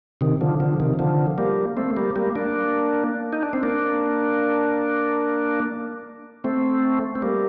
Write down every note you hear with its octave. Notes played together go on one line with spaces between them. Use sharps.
C3 D#3
D3 F3
D3 F3
C3 D#3
D3 F3
G3 A#3
A3 C4
G3 A#3
G3 A#3
A#3 D4
D#4
D4
C4
A#3 D4
A3 C4
C4
G3 A#3